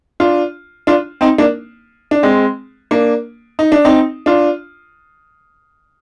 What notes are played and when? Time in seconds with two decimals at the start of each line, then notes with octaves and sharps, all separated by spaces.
0.20 D4 F4
0.87 D4 F4
1.21 C4 D#4
1.38 A#3 D4
2.11 D4
2.23 G#3 C4
2.91 A#3 D4
3.59 D#4
3.72 D4
3.85 C4 D#4
4.26 D4 F4